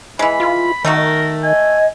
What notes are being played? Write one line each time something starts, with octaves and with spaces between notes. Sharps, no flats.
E3 G#3 B5
F4
D#3 A3 D#4 F#4 A#4
D#5 G#5